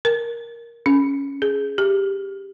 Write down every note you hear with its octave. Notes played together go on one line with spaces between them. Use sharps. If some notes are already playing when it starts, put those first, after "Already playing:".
A#4
C#4
G#4
G4